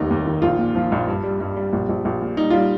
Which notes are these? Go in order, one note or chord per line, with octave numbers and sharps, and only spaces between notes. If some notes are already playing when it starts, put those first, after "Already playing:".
Already playing: F1 D#2 D#4
D#2
D#3
A#1 F4
A#2
F3
A#1
G2
G3
G2
G3
A#1
A#1
A#1
A#2
G3 D#4
G3 F4